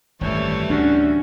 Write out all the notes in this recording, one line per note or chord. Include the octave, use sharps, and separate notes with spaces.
G#1 F#2 E3 G3 A3 C#5
D2 A2 C#4 D4 F#4